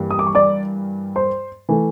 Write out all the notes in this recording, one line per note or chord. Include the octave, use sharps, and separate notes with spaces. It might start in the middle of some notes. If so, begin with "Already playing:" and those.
Already playing: G2 E3 G3 A#3
D#6
D6
C#6
D5 D6
C5 C6
E3 A3